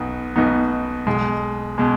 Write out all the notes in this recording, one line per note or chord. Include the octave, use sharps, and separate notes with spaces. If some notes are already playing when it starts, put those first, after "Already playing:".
Already playing: B1 B2 B3 D#4
B1 B2 B3 D#4
B1 B2 G#3
B2 G#3